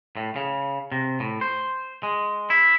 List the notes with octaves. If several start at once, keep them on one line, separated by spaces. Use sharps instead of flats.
A2
C#3
C3
A2
C5
G#3
E4